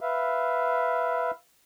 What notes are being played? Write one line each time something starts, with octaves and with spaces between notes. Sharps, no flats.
B4 E5 F5